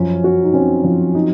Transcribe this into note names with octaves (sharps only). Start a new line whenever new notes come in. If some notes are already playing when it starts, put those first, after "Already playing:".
Already playing: F#2 F3 C#4
F#4
D#4
C4 C#4
F3
D#4